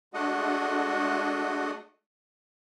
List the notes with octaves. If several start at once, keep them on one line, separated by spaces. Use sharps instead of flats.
G#3 A3 D4 F#4 D#5 F#5